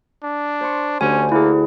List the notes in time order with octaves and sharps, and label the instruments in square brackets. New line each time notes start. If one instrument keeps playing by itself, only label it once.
[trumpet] D4
[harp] C5 C6 C#6
[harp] D2 G4 D5 [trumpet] C#4 [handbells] G#5
[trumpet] A#3 [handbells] E4 G#4